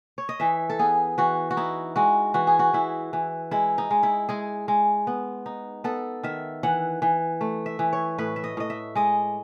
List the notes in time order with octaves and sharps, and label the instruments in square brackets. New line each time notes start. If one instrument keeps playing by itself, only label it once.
[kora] C#5
D#5
E3 E5
A4
B3 G#4
E3 F#4
F#4
D#4 E4
G#3 F#4
E3 F#4
G#4
F#4
E3 E4
E3
G#3 E4
D#4
G#3
E4
G#3 G#4
G#3
B3
D#4
B3 A4
D#3 E5
E3 F#5
E3
A3
E5
E3
C#5
A2 B4
E5
D#5
A2 D#5
E5
G#3 D#5